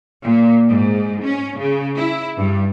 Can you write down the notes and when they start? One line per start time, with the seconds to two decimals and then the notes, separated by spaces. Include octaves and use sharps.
0.23 A#2
0.69 G#2
1.23 C#4
1.57 C#3
1.97 E4
2.37 G2